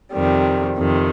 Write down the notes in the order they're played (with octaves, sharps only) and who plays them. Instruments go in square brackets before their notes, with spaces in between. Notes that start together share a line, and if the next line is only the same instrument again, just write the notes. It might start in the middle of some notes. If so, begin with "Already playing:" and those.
[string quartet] F2 C3 D#3 G3
F2 C3 D#3